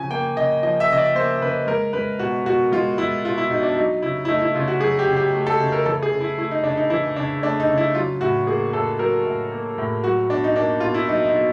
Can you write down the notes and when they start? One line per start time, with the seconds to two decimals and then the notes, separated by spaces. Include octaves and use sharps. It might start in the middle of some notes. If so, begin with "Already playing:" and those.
Already playing: C#3 F3 G#5
0.10 A#3 G5
0.36 C#3 D#5
0.63 F3 D#5
0.80 E5
0.89 C#3 D#5
0.98 D5
1.15 A#3 C5
1.41 C#3 B4
1.67 G#3 A#4
1.93 G#3 B4
2.19 B2 F#4
2.46 B2 F#4
2.72 G#3 F4
2.98 G#3 E4
3.25 B2 F4
3.38 E4
3.50 B2 D#4
3.63 D4
3.76 F#3 D#4
4.02 C#3 E4
4.25 E4
4.28 A3 D#4
4.41 E4
4.55 C#3 F4
4.68 F#4
4.81 F#3 G#4
4.99 G4
5.07 C#3
5.16 G4
5.33 A3
5.47 A4
5.60 C#3
5.72 A#4
5.86 E3 A4
6.02 G#4
6.11 C#3
6.21 E4
6.38 A3 E4
6.51 D#4
6.63 C#3 D4
6.77 D#4
6.90 E3 E4
7.16 C#3 D4
7.43 A3 D4
7.60 D#4
7.69 C#3
7.77 E4
7.95 F#3 F4
8.21 A2 F#4
8.47 A#3 G#4
8.73 A2 A4
8.99 F#3 A#4
9.26 A2
9.52 A#3
9.78 A2
10.04 F#3 F#4
10.30 B2 D4
10.44 D#4
10.56 A#3 D4
10.80 B2 F4
10.94 E4
11.09 F#3 D#4
11.26 D#4
11.35 B2